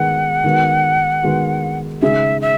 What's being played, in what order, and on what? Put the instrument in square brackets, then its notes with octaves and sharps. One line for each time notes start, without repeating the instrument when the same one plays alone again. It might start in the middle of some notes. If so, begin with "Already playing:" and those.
Already playing: [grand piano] D#3 G#3 B3 [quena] F#5
[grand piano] D#3 G#3 B3 F#4
D#3 G#3 B3 F#4
[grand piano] C#3 G#3 D#4 G#4 [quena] E5
[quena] E5